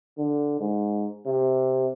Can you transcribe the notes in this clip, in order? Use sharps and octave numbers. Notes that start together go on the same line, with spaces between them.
D3
G#2
C3